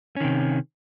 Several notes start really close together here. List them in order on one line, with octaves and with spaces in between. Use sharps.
C#4 D#3 C3